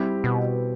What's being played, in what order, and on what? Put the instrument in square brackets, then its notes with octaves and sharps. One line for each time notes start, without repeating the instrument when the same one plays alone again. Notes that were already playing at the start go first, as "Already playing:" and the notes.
Already playing: [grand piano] G3 C4 E4 G4
[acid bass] B2